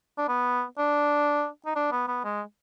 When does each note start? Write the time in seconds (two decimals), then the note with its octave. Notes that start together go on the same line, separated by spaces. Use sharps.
0.18 D4
0.29 B3
0.78 D4
1.66 D#4
1.76 D4
1.92 B3
2.08 B3
2.25 G#3